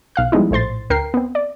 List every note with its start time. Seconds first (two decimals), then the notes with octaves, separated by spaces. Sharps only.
0.16 B1 F5 F#6
0.32 F3 G3 G#3 B3 D#4 E4
0.51 A#1 A2 C5 C6 A6
0.90 D2 A#4 G5 C7
1.14 B3 C4
1.35 D5